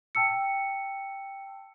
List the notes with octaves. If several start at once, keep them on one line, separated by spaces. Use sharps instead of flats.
G5 A5 E6 C#7